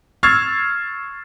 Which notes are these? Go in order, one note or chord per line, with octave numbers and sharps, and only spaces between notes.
C#6 E6 F6 G#6 A6 C7